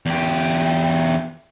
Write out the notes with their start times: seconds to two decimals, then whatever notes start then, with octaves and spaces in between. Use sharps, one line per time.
0.06 E2 G4